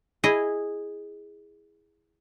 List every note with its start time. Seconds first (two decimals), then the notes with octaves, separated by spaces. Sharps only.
0.24 E4 G#4 D#5